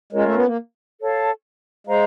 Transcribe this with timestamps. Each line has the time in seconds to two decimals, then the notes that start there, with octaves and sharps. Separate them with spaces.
0.13 G#3 C#4 F4 A#4 C#5
0.24 A3
0.35 B3
0.46 A#3
1.00 A4 C#5 F5 A5
1.87 G#3 C5 F5 A#5